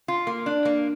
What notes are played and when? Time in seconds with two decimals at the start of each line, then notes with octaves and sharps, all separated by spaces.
0.08 F4
0.27 A#3
0.46 D4
0.65 A#3